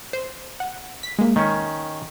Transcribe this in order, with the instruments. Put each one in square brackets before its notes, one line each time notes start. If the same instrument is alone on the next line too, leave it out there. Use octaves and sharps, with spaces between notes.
[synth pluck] C5
F#5
B6
G#3 A#3
[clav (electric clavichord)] D#3 C#4